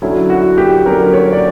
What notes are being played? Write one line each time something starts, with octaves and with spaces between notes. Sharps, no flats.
D3 F#3 C#4 E4
F#4
G4
D3 F#3 C#4 A#4
C#5
D5